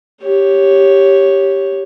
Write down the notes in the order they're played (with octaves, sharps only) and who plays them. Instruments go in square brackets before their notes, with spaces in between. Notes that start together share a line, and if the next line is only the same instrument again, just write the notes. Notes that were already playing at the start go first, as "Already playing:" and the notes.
[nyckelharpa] G4 C#5